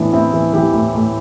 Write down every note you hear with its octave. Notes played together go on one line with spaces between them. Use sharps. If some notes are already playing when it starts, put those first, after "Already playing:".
Already playing: A2 E3 B3 D4
A2 C4 E4
E3
E3 E4 G4
A2
A2